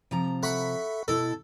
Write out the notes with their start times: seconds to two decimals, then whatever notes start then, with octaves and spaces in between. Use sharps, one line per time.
0.11 C3 F3 A#5
0.43 A4 E5 F#5 B5 C#6
1.08 B2 E4 A4